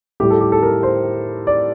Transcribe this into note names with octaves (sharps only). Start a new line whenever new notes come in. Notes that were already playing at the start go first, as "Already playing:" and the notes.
A2 G3 G4
A4
G4
A4
A#4
C5
D5